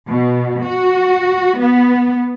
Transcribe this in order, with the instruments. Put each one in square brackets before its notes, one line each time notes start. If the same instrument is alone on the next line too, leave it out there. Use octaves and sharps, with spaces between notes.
[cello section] B2
F#4
B3